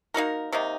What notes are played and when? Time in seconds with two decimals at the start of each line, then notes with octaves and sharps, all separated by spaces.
0.14 A#3 D#4 F#4 A#4
0.52 C3 D#3 A#3 D#4